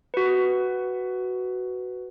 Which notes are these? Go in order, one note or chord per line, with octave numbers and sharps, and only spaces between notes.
F#4 B4